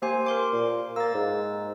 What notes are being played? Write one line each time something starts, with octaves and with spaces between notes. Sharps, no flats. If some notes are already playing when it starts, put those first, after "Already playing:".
A#3 G4 C5 G#5
A#4 C6 D6
A#2
A#3 E6 A6
G#2